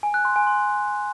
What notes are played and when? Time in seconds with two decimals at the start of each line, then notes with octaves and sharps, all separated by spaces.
0.03 G#5
0.14 F#6
0.25 C6
0.36 G#5
0.47 C6